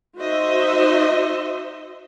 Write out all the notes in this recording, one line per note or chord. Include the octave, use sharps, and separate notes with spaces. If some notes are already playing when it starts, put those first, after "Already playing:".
D#4 F#4 C5 D#5 E5